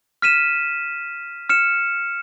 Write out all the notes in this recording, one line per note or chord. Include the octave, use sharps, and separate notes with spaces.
F6 B6 D#7 E7
F6 C#7 E7